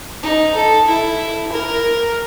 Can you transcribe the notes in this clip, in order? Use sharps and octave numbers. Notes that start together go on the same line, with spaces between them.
D#4
A4
E4
A#4